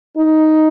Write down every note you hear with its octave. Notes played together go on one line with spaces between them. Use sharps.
D#4